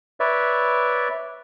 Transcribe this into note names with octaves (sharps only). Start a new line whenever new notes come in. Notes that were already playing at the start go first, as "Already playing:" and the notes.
B4 C#5 D5 E5